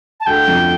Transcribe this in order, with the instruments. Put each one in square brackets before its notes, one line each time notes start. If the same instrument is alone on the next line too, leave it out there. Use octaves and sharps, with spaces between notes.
[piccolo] A5
[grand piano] D2 D3 [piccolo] G5
[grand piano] F2 F3